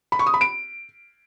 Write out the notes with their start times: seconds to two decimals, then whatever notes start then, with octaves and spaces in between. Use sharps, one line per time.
0.12 B5
0.19 C#6
0.27 D#6
0.34 B5
0.41 D7